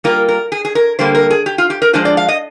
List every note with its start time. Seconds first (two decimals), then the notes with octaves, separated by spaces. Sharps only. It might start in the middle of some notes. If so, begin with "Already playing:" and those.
0.04 G3 A#3 F4 A#4
0.28 A#4
0.52 G#4
0.65 G#4
0.75 A#4
0.99 D3 G3 A#3 C5
1.15 A#4
1.30 G#4
1.46 G4
1.58 F4
1.70 G4
1.82 A#4
1.93 F3 G#3 D4 F4 C5
2.05 D5
2.17 F5
2.28 D#5